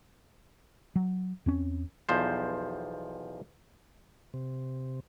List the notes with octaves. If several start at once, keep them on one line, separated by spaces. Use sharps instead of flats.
F#3
E2 C4 C#4
B1 E2 F3 C5
C3